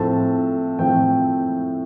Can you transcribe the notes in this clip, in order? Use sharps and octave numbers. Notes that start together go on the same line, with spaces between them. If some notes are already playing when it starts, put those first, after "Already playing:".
Already playing: A2 F3 A3 C4 A5
A2 F3 A3 C4 G5